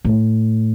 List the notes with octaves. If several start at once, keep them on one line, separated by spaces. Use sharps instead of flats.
A2